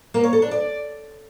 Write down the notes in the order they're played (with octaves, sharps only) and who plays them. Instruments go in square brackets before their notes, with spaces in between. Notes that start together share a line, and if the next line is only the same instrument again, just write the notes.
[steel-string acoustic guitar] A#3
C#5
A4
D4
D5